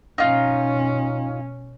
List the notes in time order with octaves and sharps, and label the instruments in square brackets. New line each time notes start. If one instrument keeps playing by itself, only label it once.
[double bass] B2 C#4 [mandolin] D#4 F4